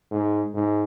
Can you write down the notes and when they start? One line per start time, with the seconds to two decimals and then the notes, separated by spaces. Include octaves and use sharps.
0.11 G#2
0.54 G#2